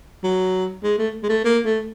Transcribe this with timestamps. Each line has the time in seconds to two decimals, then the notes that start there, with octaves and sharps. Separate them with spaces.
0.24 F#3
0.83 G#3
0.98 A3
1.23 G#3
1.29 A3
1.44 A#3
1.65 A3